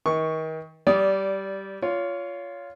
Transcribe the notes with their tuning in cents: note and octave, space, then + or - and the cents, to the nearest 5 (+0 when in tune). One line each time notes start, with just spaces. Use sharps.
D#3 +35 C#6 +0
G3 -10 D5 -20 D#6 +0
F4 +0 C#5 +25